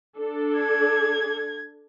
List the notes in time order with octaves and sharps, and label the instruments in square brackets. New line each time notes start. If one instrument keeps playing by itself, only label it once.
[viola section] D4 A4
[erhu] G#6